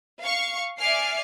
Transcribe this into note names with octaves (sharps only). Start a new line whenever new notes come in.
F5 C#6
D5 E5 G#5 D6 F6 C7